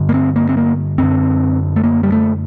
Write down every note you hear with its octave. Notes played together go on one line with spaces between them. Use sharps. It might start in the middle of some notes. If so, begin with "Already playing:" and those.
Already playing: G2 D3
A#3
C4
A#3
C4
A#3
F#2 D3 C4
A3
A#3
G3
A3